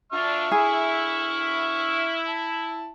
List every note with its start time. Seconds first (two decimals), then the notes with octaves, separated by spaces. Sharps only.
0.12 D4 F4 E5 C#6 F6
0.52 E4 G#4
2.27 A5